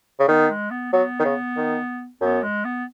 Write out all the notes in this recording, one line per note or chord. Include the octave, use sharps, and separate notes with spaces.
C#3
D#3 B3
G#3
B3
F#3 B3
D#3
C#3
D#3
F#2 B3
G#3
B3